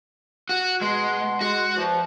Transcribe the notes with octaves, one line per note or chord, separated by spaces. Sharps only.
F#4
B2 G#3 F#4 C6
G#3 F#4
E2 F3